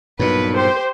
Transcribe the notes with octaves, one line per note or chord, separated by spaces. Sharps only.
B1 G2 A#2 B4
G4 C5